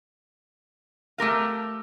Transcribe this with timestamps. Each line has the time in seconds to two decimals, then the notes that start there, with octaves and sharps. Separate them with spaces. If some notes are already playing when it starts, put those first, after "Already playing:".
1.18 A3 G4 A#4 F5